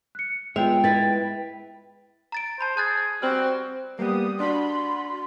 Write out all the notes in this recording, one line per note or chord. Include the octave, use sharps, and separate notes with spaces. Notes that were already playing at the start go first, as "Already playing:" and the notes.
F#6 C#7
G#3 B3 F4 E5 G5 G6 F7
E4 B4 A6
A#5 A6 D7
C5 A5 B5
G#4 A5 F#6 A6
G3 C4 F#4 F6 F#7
G3 A#3 B3 G4 D#6
D4 F#4 B5 C6